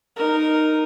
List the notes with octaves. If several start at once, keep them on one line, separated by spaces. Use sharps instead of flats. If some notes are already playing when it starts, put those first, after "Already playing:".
D#4 A#4